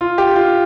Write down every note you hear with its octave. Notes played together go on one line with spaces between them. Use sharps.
F4
G4
F4